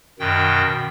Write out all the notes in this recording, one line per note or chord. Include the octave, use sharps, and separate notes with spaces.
F#2 B2 D#3 G5